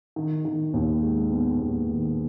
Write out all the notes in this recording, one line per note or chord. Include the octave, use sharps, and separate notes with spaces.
D#3
D#3
D#2
G#3
B3
D#2
D#3